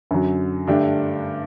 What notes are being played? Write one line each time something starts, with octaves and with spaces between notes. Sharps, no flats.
F#2 D3 F#3
G2 D3 A3 D4 G4